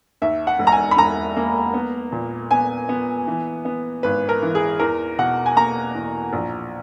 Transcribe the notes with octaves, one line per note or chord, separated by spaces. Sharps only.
D#2 E5
F#5
E1
A#5
G#5
B5
E1 A#5
A#3
B3
A#2
B3 G#5
B3
E3
B3
G#1 B4
A#4
E3
G#4
E2 A#4
B2 F#5
G#5
A#3 A#5
E2
A#1